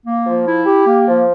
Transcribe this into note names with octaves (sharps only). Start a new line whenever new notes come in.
A#3
F3
E4
G4
A#3
F3